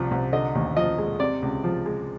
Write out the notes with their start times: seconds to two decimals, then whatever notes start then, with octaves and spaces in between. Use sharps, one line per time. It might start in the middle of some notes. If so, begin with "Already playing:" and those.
Already playing: C2 C3 F3
0.11 C2
0.33 D3 D#5
0.55 D#2
0.76 F3 D#5
0.98 G#3
1.20 C3 D5
1.42 C#2
1.64 F3
1.86 G#3